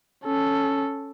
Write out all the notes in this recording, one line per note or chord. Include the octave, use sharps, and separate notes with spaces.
C#4 A4